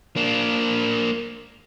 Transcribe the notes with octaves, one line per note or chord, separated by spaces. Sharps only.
A#3 D4